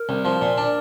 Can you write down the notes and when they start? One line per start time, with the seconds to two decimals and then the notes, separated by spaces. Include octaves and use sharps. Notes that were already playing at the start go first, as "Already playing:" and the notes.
Already playing: A#4
0.09 C2
0.25 F3
0.41 A#2
0.57 D4